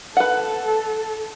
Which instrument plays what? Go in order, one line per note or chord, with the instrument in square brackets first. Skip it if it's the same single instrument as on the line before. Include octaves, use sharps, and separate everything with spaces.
[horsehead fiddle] A4 [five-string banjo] B4 F#5